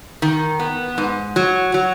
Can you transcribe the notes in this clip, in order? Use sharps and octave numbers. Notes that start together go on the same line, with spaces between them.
D#3
B3
G#2
F#3
F#3